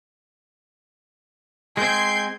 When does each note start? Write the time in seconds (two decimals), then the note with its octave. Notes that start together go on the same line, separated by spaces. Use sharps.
1.77 G#3 C4 G6 G#6 C7